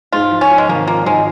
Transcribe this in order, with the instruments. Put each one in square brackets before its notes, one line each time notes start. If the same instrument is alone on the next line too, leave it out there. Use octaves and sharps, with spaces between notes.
[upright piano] G#2 [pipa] F4
[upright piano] F3
[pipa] C#4
[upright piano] F3
[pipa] G#3
[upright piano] G#1 [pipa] A#3
[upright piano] F3 [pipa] A#3
[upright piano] G#1 [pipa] G#3